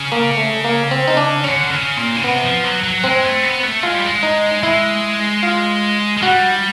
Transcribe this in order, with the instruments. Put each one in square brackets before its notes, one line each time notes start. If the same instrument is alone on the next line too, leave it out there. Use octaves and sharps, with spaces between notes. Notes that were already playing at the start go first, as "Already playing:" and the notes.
Already playing: [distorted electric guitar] C#3
[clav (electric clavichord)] A#3
A3
A#3
C4
D#4
D4
[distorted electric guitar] D3 [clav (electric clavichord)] C#4
[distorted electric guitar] C#3
A#2
C#3
[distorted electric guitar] C3 [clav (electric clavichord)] B3
[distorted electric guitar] F3
F#3
F#3
[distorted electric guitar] G#3 [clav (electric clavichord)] C4
[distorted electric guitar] A3
B3
A3
[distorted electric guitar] G#3 [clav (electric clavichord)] F4
[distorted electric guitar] G3
G#3
[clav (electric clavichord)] D#4
[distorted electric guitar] G#3 [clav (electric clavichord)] E4
[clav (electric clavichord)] F4
[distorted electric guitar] G#3
[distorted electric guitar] G3 [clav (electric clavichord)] F#4